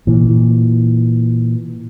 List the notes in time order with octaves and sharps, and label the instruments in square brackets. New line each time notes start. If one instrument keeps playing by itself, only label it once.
[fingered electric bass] A#2 E3